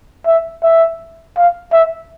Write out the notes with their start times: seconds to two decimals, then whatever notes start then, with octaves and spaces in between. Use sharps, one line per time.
0.27 E5
0.63 E5
1.37 F5
1.73 E5